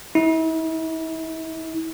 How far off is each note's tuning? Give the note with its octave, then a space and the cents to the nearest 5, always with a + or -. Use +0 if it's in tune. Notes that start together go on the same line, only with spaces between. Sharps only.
E4 -40